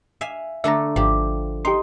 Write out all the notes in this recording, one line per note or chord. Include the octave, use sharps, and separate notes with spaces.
E5 F5 G#5
D3 A3 A4 E5 A#5
G#1 F3 G4
D#4 G4 C6